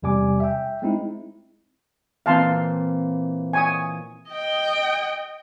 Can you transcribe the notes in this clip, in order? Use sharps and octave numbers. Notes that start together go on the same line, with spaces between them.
E2 C3 G3 G#5 D6
E5 G5
G#3 C4 D#4 E4
A#2 E3 C4 F5 A5 C6
G#5 C#6 D#6
D#5 G5